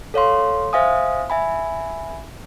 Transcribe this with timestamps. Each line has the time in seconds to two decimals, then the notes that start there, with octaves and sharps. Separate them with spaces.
0.14 A4 C#5 F5 C6
0.73 C5 E5 F5 G#5 D#6
1.30 E5 G#5 B5